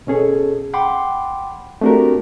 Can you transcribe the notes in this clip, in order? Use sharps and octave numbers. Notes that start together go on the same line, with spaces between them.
B2 C#4 G#4 A4
F#5 G5 B5 C6 D6
A3 C4 D4 F#4 G4 A#4